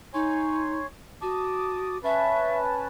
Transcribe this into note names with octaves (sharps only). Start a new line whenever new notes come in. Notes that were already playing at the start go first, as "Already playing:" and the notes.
D#4 C#5 G#5 C6
F#4 A5 D6 D#6
C#4 B4 E5 A5